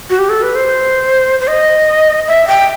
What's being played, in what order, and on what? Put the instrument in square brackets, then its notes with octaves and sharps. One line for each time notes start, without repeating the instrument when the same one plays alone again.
[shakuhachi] F#4
G4
A4
B4
C5
C5
D#5
E5
G5